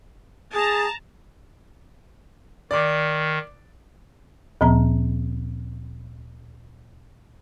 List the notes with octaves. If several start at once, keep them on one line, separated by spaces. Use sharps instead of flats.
G#4 A5 A#5
D#3 D5 D6
D2 A#2 F3 B3 A#5